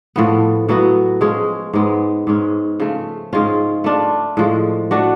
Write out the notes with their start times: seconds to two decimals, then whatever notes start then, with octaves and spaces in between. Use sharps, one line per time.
0.16 A2 F3 B3
0.68 A2 F#3 B3 F#4
1.21 F3 G#3 C#4 G#4
1.73 G#2 G#3 B3
2.27 G#2 G#3 C#4
2.80 C#3 F3 A3
3.33 G#2 G#3 C#4 F4
3.84 A3 D4 F4
4.37 A2 F3 G#3
4.91 A3 D4 F#4